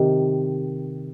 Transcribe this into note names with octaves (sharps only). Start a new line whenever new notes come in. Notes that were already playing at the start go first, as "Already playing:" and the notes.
Already playing: C3 D#3